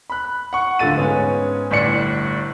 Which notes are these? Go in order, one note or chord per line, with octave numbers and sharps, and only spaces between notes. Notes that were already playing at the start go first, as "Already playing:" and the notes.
B5 F#6
F#5 C#6
D1 D3 F4 A4 A6 D#7
G#2 B3 C#4
G1 A2 D5 C#7